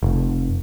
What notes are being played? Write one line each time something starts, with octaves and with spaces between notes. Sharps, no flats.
F1